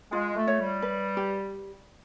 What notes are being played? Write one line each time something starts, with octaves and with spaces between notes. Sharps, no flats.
G#3 F4
A3
C#5
G3
B4
G4